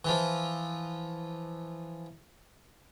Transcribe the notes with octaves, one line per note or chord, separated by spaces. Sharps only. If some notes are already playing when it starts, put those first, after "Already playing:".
E3 F3